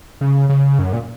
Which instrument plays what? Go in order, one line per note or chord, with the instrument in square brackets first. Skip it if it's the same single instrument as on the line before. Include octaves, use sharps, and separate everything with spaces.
[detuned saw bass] C#3
C#3
F#2
A#2